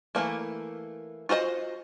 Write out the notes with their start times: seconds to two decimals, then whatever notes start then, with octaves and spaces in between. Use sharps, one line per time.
0.15 E3 F3 A3 A#3
1.29 F4 F#4 C5 D5 D#5